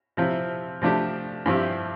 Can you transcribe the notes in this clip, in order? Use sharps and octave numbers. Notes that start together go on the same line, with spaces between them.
C3 F3 C4 E4
C3 F3 A3 D4 G4
G2 F3 C4 E4 G4